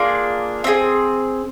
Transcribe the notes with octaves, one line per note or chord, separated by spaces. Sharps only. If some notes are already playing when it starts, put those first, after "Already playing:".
Already playing: A#3 D4 F4 G#4 F5
C4 E4 G#4